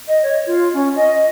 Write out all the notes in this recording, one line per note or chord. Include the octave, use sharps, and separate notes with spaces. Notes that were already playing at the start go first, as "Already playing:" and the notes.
D#5
C#5
F4
C#4
D#5